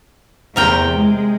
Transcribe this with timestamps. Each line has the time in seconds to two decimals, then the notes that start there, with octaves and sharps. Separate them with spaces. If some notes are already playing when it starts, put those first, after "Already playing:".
0.56 E2 C3 A#4 G5
0.97 G#3